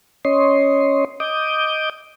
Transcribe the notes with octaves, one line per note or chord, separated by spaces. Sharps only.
C#4 C#5 D#5 C6
D#5 D6 D#6 G6